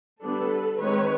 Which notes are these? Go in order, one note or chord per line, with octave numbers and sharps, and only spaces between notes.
D3 G3 B3 D4 A4 B4
D#3 G#3 C4 B4 C#5